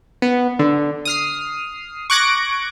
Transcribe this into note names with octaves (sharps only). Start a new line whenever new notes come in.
B3
D3
D#6 F6 C7
C#6 D6 F#6 G#6 A#6 D7